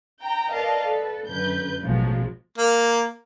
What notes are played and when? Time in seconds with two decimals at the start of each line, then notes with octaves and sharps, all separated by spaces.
0.21 G5 A#5
0.51 A#4 B4 D5 D#5 F5 A5
0.84 A4 B4
1.28 F#2 D3 B4 G6
1.83 A1 B2 F3 F#3 G#3
2.58 A#3